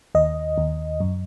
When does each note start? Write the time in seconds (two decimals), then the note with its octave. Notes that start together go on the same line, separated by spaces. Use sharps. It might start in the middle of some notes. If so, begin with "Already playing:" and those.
0.15 D#2 D#5
0.58 D#2
1.00 F#2